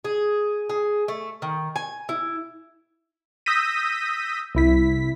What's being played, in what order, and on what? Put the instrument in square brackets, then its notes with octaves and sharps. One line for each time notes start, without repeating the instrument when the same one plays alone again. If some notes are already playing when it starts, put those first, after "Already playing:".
[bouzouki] G#4
G#4
A3
D#3
G#5
E4
[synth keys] D#6 E6 G6 A#6 B6 D#7
C2 E4 B6